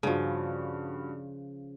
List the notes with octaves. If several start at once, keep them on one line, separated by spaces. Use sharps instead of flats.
G2 C#3 F3 F#4